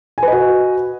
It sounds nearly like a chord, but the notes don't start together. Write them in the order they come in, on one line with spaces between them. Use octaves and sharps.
G#5 B4 D#5 F#4